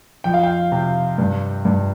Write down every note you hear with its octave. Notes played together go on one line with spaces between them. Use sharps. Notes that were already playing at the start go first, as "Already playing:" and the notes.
F2 G5
F5
G5
C3
G2
G2